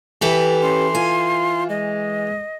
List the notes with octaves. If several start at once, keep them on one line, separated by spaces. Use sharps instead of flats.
E3 G4 A4 B4
C#4 C6
F4 G#5
G#3 D#5